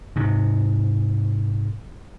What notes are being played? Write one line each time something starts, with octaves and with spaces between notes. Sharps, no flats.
G#2 C3